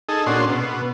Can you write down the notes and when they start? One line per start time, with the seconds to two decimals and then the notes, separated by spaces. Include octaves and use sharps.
0.09 D#4 G#4 A4
0.26 A#2 C#4 D4 F#4 C6
0.48 B2